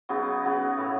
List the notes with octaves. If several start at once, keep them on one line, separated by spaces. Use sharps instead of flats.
C#3 F#3 B3 D#4
C#3 F#3 B3 D#4
A2 E3 A3 E4